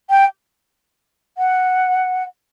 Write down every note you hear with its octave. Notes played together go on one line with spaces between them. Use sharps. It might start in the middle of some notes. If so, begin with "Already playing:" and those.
G5
F#5